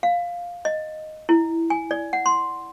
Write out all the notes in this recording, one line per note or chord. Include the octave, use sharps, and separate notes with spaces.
F5
D#5
E4
G#5
D5
F#5
C6